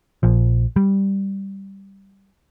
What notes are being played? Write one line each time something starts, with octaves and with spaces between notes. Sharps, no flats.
A#1 F3
G3